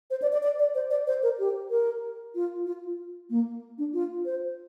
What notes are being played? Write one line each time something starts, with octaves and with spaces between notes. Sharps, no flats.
C5
D5
D5
D5
D5
C5
D5
C5
A#4
G4
A#4
F4
F4
A#3
D4
F4
C5